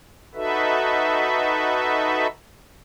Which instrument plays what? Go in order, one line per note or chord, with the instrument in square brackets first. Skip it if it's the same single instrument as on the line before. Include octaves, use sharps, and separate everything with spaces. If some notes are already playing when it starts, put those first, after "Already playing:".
[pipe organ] D#4 F#4 A4 B4 E5